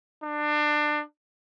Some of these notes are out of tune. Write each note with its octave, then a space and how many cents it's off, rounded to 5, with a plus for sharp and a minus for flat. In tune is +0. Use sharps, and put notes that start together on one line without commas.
D4 +25